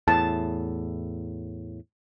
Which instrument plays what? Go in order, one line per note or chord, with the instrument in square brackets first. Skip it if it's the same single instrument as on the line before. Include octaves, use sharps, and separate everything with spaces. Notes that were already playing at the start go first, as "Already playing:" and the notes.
[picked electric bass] E2 A2 [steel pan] A5